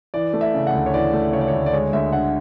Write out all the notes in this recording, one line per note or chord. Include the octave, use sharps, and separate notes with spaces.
E3 D5
A3
E5
C#3
F#5
D2
C#5
E3 D5
A3
C#3 C#5
D5
C#5
D2
D5
G#3 C#5
D2 E5
D3 F#5